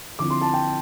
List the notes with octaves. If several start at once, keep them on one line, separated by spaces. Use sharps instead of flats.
D3 F3 C4 E4 D6
C6
A5
G5